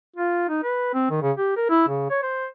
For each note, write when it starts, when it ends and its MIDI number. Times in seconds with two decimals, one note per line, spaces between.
0.16 0.46 65
0.49 0.62 63
0.64 0.93 71
0.94 1.10 60
1.10 1.20 51
1.22 1.32 49
1.37 1.52 67
1.57 1.66 70
1.70 1.87 64
1.89 2.05 49
2.10 2.21 73
2.23 2.47 72